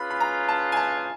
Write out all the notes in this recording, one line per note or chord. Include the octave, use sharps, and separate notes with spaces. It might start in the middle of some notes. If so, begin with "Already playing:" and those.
Already playing: C#4 F4 G#4 B4 B5
B5
A#5
A5
G#5
A5